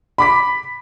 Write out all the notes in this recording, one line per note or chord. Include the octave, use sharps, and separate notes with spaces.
B5 D6 B6